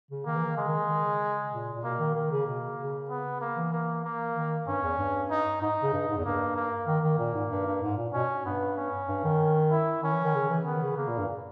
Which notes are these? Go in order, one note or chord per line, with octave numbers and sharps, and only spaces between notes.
C#3
D#3 A#3
E3
D#3
C#3 G#3
D#3
D#3
C#3
A#2
A#2
B2 A#3
D#3
D#3 A#3
C#3
B2
C#3
B3
A#3
E3
A#3
A#3
D#3
G2 C#4
E2
G2
D#4
G#2 D#4
C#3
G2
G#2
E2
G2 A#3
A#3
D#3 A#3
D#3
A#2
G#2
G2
G2
G#2
A#2
B2 C#4
G2 B3
C#4
G2
D#3
E4
D#3 C#4
E3
D#3
C#3
E3
D#3 B3
C#3
C#3 A#3
A#2
G2